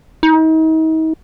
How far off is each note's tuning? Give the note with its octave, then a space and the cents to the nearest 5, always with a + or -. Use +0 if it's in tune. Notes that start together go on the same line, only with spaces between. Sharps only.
D#4 +40